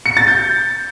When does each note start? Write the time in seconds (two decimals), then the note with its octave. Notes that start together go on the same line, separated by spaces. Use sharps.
0.06 C#7
0.17 A6
0.28 G6